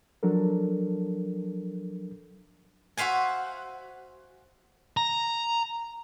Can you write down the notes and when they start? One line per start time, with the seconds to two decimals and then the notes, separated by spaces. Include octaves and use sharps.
0.23 F3 F#3 D4 A4 A#4
2.97 F#4 C5 E5 F5 G#5
4.97 A#5